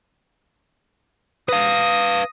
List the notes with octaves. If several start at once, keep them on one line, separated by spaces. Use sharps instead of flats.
B4 F5 D#6 A#6